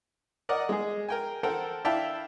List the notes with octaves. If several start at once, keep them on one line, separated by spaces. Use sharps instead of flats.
A#4 D5 D#5 F#5
G#3 G#4
A#4 G5 G#5
A4 A#4 C5 F#5 G5
D4 E4 E5 F5 G5 A5